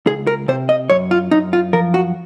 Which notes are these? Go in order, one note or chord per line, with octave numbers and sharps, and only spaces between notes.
C#2 G#4
A#4
C3 C5
D#5
F#2 C#5
F4
F#2 D#4
F4
F3 A#4
F#4